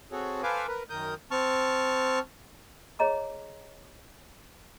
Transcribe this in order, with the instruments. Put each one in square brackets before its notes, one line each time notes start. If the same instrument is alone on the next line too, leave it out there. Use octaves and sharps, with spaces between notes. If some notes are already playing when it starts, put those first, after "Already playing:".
[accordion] C4 F#4 G#4 A4 C#5
A4 B4 C5 F5 G#5 D6
A#4 B4
F#2 D#3 A#4 D#6 G6
[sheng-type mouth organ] C4 A5 C#6 F6
[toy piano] G#4 C#5 D#5 A#5 D6